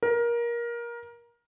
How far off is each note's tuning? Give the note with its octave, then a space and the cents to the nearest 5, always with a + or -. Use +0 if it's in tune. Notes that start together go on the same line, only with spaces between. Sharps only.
A#4 +20